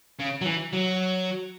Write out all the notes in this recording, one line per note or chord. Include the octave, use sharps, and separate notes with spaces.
C#3
F#3
E3
F#3